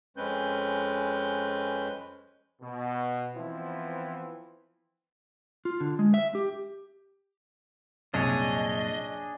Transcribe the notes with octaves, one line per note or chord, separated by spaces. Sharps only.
F2 G#3 C4 C#4 B4 G6
B2
E3 F3 B3 C4 E4
F4
D3
G#3
E5
G4
C2 F#2 A#2 D4 G#4 C#5 D#5